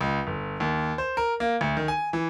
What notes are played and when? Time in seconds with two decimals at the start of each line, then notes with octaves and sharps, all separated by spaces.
0.01 C#2
0.27 G1
0.60 D#2
0.98 C5
1.17 A#4
1.40 A#3
1.61 D2
1.77 D#3
1.88 G#5
2.13 E3